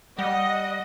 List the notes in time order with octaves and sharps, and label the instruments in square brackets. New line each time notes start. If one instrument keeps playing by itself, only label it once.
[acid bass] G3 [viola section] D#5 [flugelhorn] F#5